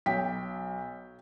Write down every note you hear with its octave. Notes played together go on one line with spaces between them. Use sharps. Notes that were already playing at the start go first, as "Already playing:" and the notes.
B1 C#5 G5 B6